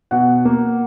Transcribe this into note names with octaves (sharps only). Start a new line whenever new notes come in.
B2 F#5
A#3